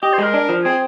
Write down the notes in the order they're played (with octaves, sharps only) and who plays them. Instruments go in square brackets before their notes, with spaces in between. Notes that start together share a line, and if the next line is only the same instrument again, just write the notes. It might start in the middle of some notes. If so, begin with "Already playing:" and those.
[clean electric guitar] G4 [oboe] D#5
[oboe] C5
[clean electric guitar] G#3 [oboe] A#4
[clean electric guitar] D4
F3
[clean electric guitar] C4 [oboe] G#4